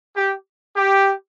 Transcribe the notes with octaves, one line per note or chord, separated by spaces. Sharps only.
G4
G4